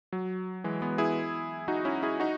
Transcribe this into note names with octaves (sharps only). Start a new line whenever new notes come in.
F#3
E3 G#3
G#3 B3
E4 G#4
D#4 F#4
C#4 E4
E4 G#4
D#4 F#4